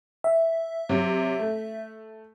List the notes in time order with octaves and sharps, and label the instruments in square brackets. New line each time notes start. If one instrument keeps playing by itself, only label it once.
[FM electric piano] E5
[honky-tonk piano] C3 F#3
A3